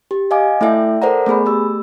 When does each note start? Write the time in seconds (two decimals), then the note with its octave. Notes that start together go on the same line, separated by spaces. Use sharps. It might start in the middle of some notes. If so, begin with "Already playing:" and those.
0.11 G4
0.31 D#5 F5 G#5 D6
0.61 A3 E4 A4 D5 E5 G5
1.02 A4 A#4 C5 D5 F#5 A#5
1.26 A3 B3 G#4 B5
1.46 A3 G4 E6